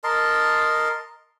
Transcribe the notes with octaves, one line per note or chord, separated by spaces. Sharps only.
A#4 D#5 A5 C6